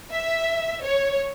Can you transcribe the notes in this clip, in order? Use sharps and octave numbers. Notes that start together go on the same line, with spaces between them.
E5
C#5